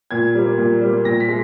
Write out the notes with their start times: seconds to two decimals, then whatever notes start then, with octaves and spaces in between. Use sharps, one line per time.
0.11 A#2 G#6
0.35 G3 A#3
0.58 A#2
0.81 G3 A#3
1.05 A#2 A#6
1.20 B6
1.28 G#3